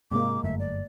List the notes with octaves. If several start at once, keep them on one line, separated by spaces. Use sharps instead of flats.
G#2 C3 G#3 A#3 D6
G1 F#2 A3 E5
D5